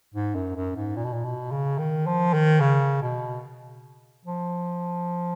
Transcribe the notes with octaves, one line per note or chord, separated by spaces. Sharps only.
G#2
F#2
F#2
G#2
A#2
B2
A#2
B2
C#3
D#3
F3
D#3
C#3
B2
F3